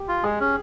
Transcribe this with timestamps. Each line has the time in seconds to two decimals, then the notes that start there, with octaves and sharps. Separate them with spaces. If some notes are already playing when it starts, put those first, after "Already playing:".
Already playing: G4
0.08 F4
0.23 G#3 G#4
0.40 C#4